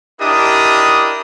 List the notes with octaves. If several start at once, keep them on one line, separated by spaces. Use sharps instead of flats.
D4 E4 G4 A#4 D#5 D#6